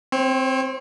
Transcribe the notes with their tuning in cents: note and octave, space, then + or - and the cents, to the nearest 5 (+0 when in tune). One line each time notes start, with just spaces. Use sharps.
C4 +0 C#5 -40